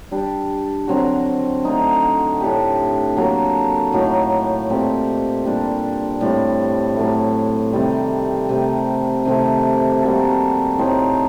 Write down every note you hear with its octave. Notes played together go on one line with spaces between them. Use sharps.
G3 D4 G4
D3 F#3 C4 F#4
D3 A3 D#4
A2 A3 D4 G4
F#3 A#3 F#4 A4
A2 F#3 A#3 D#4
A#2 A3 C4 G4
A#2 G3 D4
A2 G3 C4
A2 F#3 A3
C3 D#3 G3 C4
C3 D#3 A3
C3 D#3 A3 C4
G3 A#3 F#4 A4
A2 A3 C4 D#4